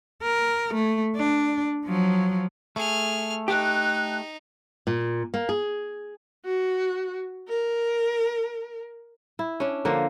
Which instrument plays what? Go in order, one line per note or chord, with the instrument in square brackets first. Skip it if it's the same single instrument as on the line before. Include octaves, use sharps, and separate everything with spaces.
[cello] A#4
A3
D4
F3 F#3
[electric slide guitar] A3 [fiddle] G#4 F6
[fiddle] D#4 [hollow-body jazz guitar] G4 [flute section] F#6
[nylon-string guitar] A#2
A#3
G#4
[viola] F#4
A#4
[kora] E4
C#4 D4
D3 F3 A#3 F4